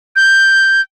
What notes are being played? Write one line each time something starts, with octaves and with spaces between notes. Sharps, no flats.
G6